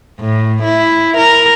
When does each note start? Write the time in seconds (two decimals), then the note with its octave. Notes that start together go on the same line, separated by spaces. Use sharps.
0.20 A2
0.64 E4
1.18 A#4